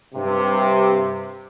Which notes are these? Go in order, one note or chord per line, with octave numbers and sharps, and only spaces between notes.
G2 C3